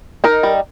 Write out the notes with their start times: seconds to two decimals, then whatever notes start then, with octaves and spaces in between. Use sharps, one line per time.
0.24 D#4 A#4
0.43 G3